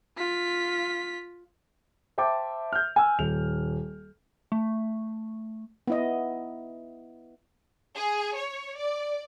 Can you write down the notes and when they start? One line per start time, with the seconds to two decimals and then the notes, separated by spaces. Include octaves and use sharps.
0.17 F4 B6
2.18 C5 E5 G5 A5 D6
2.72 F6 G6
2.96 G#5 E6
3.19 D#1 F7
4.52 A3
5.88 B3 E4 D#5
7.96 G#4
8.35 C#5
8.77 D5